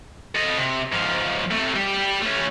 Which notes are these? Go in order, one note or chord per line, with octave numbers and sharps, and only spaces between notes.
A4 D#5
C3
G#2 F3
C3 A3
G3 G4
A3 C#4